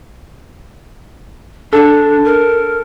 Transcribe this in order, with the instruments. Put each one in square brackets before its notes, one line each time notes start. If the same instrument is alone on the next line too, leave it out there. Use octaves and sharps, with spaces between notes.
[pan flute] D4 [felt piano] A4
[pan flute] A#4